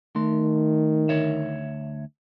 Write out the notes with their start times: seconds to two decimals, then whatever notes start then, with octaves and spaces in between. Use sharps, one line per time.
0.16 D#3 A3 C6
1.09 D2 C#5 E5